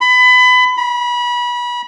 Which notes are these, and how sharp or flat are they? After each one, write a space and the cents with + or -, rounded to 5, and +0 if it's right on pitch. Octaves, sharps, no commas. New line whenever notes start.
B5 +25
B5 -30